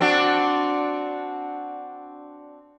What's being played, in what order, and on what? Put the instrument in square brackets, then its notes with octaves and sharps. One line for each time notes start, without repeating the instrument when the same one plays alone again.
[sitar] C4 D4 F#4